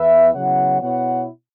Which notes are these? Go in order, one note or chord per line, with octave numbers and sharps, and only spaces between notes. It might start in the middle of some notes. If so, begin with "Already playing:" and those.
Already playing: E2 E3 B3 B4 E5
C#3 F#3 B3 E4 C#5 F#5
B2 B3 E4 C#5 F#5